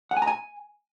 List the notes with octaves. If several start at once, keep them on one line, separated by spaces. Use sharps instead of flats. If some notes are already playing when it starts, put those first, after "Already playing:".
F#5
G#5
A#5
G#5